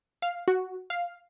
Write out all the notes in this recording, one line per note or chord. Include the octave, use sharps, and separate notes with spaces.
F5
F#4
F5